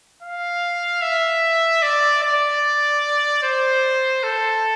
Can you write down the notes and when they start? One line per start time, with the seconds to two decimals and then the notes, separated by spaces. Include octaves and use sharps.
0.23 F5
1.02 E5
1.82 D5
2.23 D5
3.43 C5
4.24 A4